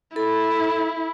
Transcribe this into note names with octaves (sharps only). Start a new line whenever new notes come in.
E4 A4